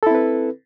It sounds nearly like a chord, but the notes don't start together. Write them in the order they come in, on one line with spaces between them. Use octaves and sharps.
A4 E4 C4 B4